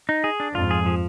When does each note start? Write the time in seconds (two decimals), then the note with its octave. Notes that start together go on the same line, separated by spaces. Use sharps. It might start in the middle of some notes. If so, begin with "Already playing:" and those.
0.09 D#4
0.24 G#4
0.40 D4
0.55 F2 G#2 F4
0.71 G#4
0.86 F3